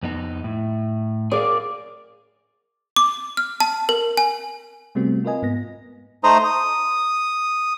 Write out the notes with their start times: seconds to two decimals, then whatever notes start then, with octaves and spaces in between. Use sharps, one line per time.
0.03 F2 B3 D#4
0.44 A2
1.31 G#4 A#4 D5 F5
2.96 D6
3.37 F6
3.60 A5
3.89 A#4
4.17 G#5
4.95 C3 G3 A3 B3 C4 F#4
5.25 F4 A#4 B4 D#5 G#5
5.42 G#2 B3 A#6
6.24 A3 D#4 C5 A#5 D#6
6.44 D#6